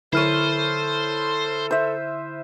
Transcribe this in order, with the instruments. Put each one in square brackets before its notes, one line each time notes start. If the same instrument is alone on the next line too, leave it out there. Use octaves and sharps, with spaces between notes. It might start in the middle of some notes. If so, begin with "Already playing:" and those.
[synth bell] D3 F6 D#7 [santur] E4 C#5 [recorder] A4 [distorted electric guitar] C5
[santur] C5 E5